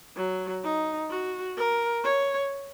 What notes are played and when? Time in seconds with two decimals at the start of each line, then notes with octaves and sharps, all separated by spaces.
0.16 F#3
0.64 D#4
1.10 F#4
1.57 A#4
2.04 C#5